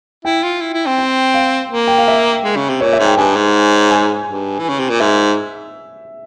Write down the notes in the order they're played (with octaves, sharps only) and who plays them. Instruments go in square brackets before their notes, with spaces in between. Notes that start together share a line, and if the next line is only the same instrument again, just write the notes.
[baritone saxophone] E4 [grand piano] G5
[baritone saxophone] F4
E4
E4
C4
[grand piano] G5
F5
[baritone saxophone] A#3
[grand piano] G5
F5
E5
[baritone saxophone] G#3
C#3
C3
[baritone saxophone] A#2 [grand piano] C#5
[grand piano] E5
[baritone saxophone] G#2
[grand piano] G5
[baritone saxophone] G2 [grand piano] G#5
[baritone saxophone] G#2
[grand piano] G#5
[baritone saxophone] G2
E3
C#3
C3
A#2
[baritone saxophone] G#2 [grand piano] E5